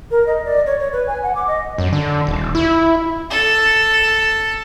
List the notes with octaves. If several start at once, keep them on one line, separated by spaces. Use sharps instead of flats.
A#4
D#5
D5
C#5
C#5
B4
G#5
F#5
D6
D#5
F#2
D3
D#1
E4
A4